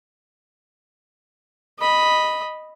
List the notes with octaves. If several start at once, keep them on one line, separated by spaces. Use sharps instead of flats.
D#5 B5